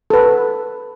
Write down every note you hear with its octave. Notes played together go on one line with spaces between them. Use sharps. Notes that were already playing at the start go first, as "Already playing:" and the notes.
A4 B4